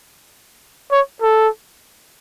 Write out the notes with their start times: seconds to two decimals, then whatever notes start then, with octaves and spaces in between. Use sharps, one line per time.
0.92 C#5
1.22 A4